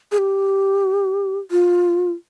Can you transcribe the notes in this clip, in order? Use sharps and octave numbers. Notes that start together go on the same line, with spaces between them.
G#4
G4
F4